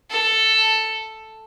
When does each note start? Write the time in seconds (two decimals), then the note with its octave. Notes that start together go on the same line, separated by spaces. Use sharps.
0.10 A4